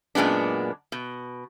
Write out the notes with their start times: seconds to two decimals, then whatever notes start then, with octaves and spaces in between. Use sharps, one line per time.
0.15 F#2 A#2 G#3 B3 D4
0.92 B2